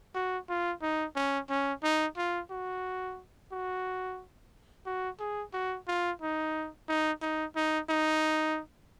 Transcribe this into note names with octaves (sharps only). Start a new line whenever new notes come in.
F#4
F4
D#4
C#4
C#4
D#4
F4
F#4
F#4
F#4
G#4
F#4
F4
D#4
D#4
D#4
D#4
D#4